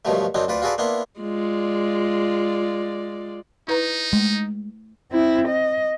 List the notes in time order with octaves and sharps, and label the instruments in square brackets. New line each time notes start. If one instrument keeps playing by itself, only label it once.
[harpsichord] G2 B2 D#3 F3 F#3 A3
F#2 F#3 C4 D4 D#4
D2 F4 B4 D5
F4 F#4 G#4 A4 B4 D5
A#3 B3 D4 E4 C6
[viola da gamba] G#3 F4 D5
[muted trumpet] D#4 [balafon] E4 B4 A#5
[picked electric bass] G#3 [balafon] A3
[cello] C4 E4
D#5